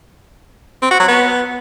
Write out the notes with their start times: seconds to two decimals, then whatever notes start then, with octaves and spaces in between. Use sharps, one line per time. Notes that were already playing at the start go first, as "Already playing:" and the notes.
0.82 C4
0.91 F#4
1.00 F#3
1.09 B3